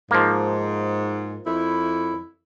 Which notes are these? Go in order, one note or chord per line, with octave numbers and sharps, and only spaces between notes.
G#2 F3 A#3
F2 E4